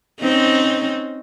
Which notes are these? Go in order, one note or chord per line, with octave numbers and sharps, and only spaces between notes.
C4 C#4 D#4